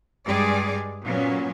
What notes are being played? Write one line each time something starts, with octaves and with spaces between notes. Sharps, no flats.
G2 G3 G#3 G#4 D5
A#2 F#3 B3 C#4